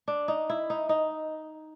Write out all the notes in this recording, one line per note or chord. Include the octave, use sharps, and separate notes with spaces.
D4
D#4
E4
D#4
D#4